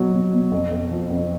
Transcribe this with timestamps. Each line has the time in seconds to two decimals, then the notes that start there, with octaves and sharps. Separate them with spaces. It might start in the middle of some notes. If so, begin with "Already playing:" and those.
Already playing: B2 F#3
0.13 B2
0.33 B2
0.52 F2
0.71 F2
0.91 F3
1.10 F2